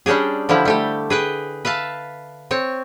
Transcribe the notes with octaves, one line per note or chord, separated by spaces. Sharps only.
G3 C#4 D4 G4 G#4
D3 F3 G3 E4
G3 A3 G4
G#4 B4 G5
B4 E5 F5 A5
C4 C#5